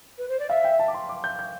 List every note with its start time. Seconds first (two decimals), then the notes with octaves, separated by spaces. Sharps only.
0.18 B4
0.28 C5
0.39 D5
0.49 E5 F5
0.65 G5
0.79 A5
0.88 D6
0.94 C6
1.09 D6
1.24 G6
1.39 G6